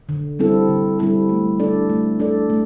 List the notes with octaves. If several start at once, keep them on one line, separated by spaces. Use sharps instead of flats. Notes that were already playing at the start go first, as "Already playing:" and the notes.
D3
G3 C4 E4 A4
D3
G3 C4 E4 A4
A3
D4 A4 D5
A3
D4 A4 D5
A3